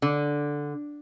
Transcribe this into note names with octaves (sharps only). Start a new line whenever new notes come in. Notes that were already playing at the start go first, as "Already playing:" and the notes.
D3